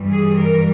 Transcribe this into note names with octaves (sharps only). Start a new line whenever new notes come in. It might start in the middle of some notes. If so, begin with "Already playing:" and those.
Already playing: G2 E3 G3
G#4
A#4